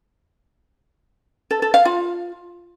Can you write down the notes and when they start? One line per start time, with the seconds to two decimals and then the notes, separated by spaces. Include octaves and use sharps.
1.51 A4
1.62 A4
1.74 F5
1.85 F4